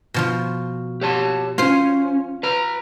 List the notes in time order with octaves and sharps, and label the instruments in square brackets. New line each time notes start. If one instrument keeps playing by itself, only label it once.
[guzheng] B2 F3 F4
[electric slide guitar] G4 C#5 A5
[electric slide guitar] A2 C#4 [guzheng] F4 C5
[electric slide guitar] B4 A#5